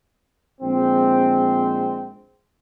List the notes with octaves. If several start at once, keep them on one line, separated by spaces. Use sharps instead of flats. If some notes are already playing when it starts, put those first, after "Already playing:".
A#1 G#3 C4